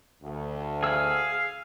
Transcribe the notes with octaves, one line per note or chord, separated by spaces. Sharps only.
D2
G#4 F5 E6